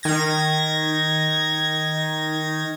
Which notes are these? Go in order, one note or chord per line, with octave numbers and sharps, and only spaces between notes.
D#3 G#6 A#6